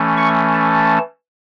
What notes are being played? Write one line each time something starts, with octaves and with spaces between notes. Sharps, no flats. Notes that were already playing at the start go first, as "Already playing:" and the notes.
Already playing: E3 A3 C#4
C#6
A5